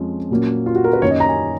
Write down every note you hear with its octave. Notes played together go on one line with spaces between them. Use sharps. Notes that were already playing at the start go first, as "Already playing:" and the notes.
Already playing: F2 F3 G#3 C#4
A#2 F#3 A#3 C#4
F4
F#4
A#4
B4
F#2 D#3 A#3 C#4 C#5
D#5
A#5
G#5